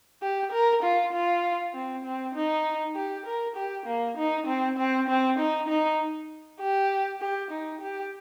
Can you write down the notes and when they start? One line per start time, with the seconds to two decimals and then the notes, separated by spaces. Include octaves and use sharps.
0.22 G4
0.52 A#4
0.83 F4
1.13 F4
1.74 C4
2.05 C4
2.35 D#4
2.95 G4
3.26 A#4
3.56 G4
3.86 A#3
4.17 D#4
4.47 C4
4.77 C4
5.08 C4
5.39 D#4
5.68 D#4
6.61 G4
7.21 G4
7.51 D#4
7.81 G4